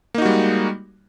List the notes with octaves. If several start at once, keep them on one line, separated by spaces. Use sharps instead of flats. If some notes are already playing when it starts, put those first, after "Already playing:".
G3 G#3 A#3 D#4 F#4